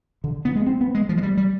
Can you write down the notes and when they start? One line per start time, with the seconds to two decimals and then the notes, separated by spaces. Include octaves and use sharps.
0.24 D3
0.45 B3
0.56 G#3
0.67 C4
0.81 B3
0.95 G#3
1.09 F3
1.17 G#3
1.23 G3
1.37 G3